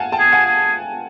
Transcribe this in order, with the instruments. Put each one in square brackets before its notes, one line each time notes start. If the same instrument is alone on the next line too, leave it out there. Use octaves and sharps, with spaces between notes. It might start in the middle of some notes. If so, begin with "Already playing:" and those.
Already playing: [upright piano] F5 F#5 G#5 A5
G5 A5
[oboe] G#4
[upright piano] F#5 G#5
[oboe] G#4